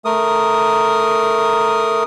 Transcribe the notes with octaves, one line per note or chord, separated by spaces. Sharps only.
A3 A#4 D#6